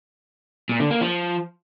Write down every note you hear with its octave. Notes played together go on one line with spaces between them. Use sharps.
A#2
D3
A#3
F3